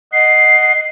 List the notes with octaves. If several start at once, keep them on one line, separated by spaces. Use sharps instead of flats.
D#5 F#5 C7